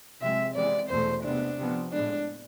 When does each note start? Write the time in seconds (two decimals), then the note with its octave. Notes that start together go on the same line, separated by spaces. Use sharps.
0.21 C3 F3 G#3 C4 E5
0.55 C3 E3 G#3 B3 D5
0.90 E2 B2 A3 C5
1.23 C3 G#3 B3 D4
1.58 C3 F3 B3
1.92 A2 G#3 B3 D4